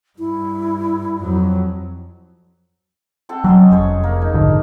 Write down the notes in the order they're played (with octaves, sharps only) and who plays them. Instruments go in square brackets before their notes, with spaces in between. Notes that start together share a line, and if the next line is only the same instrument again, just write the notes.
[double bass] G2 [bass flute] E4
[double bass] F2 F#3
[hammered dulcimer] C4 A4 F#5
[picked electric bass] F#3 [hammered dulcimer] C#4 D#5 C6
[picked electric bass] F1 [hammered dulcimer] G#4 C5 C#5
[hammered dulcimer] A#3
D#4
[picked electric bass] A#1 G#2 D3